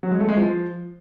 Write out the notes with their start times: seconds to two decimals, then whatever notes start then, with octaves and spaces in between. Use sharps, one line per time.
0.03 F#3
0.12 G#3
0.20 A3
0.29 G#3
0.37 F3